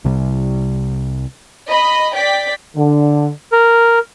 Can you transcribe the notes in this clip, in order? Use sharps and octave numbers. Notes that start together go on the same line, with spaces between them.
C2 C3 G3
D#5 B5
D5 G5 B6
D3
A#4